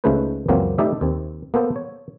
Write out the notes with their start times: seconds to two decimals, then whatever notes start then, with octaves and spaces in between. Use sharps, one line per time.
0.04 C#2 C#3 A3 D#4 B4 C5
0.48 C#2 F#2 E3 F#3 A#3 C4
0.78 A3 D#4 G4 B4 D5 E5
1.01 D#2 C4
1.54 A#3 B3 A4 C5
1.76 C#5